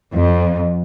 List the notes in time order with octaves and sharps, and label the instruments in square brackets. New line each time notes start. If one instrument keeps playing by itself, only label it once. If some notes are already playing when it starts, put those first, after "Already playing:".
[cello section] F2